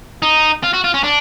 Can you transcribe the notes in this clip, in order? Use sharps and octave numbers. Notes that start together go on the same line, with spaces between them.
D#4
F4
F#4
F4
C#4
D4